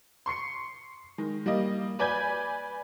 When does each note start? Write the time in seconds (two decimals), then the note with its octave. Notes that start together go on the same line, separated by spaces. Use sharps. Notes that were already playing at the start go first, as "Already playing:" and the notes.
0.26 C6 C#6 C7 C#7
1.18 D#3 G#3
1.46 G3 A#3 D#5
1.99 B4 D5 G#5 B5 G6 G#6